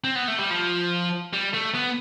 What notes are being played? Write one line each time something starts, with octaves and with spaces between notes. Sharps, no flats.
C4
B3
A3
G3
F3
G3
A3
B3